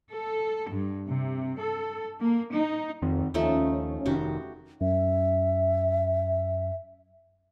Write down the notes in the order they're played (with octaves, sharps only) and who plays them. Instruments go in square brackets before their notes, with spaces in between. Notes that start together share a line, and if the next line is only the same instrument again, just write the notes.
[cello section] A4
G2
C3
A4
A#3
D#4
[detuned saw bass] F2 [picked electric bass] D#3 C4
[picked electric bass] D#2 [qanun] F3 A3 D#4 [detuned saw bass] C#4
[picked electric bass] F1 D#3 [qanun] F#4 G4
[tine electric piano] F#2 [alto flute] E5